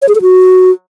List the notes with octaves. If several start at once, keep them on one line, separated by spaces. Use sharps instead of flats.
C#5
G#4
A4
F#4